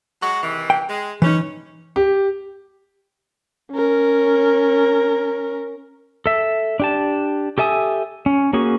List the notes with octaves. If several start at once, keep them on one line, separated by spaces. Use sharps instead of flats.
F#3 G#3 F#4
C3 D#3 E3
G5
G#3
E3 C#4 D#4
G4
C#4 A#4
A4 E5
D4 G4 A5
G4 A4 E5 G#5 D#6
C#4
A#3 C#4 F#4 G#4